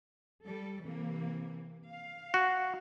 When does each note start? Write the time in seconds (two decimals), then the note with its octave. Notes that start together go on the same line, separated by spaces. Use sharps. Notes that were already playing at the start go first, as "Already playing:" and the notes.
0.43 G3 A4
0.82 C3 E3 A#3
1.90 F5
2.34 F#4